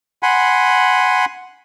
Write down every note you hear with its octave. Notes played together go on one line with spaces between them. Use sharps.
F#5 G#5 B5 C6